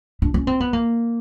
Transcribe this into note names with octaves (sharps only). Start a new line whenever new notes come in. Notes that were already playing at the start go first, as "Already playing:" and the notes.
D4
C#4
C4
B3
A#3